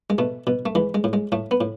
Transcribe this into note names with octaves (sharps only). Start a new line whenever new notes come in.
G#3
B2 A3
B2
A3
E3 G#3
G#3
A2
G#3
A2 A3
B3
A2